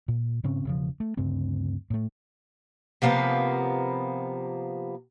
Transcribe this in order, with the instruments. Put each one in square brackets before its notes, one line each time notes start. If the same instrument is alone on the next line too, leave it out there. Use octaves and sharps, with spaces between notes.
[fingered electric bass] A#2
G#2 C#3 C4 C#4
E1 C#3 F3
A3
D2 G2 C#3 C4
A2 A3
[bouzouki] C3 F3 A#3 B3